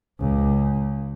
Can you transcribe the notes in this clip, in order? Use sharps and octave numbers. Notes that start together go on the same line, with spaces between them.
C#2